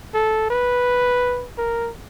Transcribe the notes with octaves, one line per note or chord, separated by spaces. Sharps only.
A4
B4
A#4